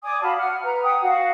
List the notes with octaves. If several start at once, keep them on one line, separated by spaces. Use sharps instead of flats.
D5 G#5 D6 D#6
F#4 F5 A5 B5
F#5 F6
B4 A#5
F#5 G5 D#6
F#4 F5 F#5